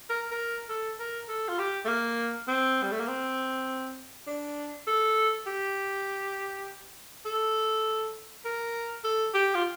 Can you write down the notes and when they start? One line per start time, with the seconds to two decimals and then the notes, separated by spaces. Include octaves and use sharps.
0.09 A#4
0.31 A#4
0.69 A4
0.99 A#4
1.29 A4
1.48 F4
1.59 G4
1.85 A3
1.88 A#3
2.48 C4
2.83 G3
2.92 A3
3.00 A#3
3.08 C4
4.27 D4
4.87 A4
5.46 G4
7.25 A4
8.45 A#4
9.04 A4
9.34 G4
9.55 F4